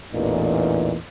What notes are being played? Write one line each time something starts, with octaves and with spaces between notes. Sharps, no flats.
A1 E2 A#2 D#4